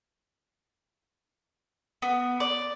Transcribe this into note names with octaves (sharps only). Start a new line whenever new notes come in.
B3
D5